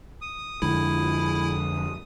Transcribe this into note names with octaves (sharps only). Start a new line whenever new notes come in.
D#6
F2 D3 G#3 E4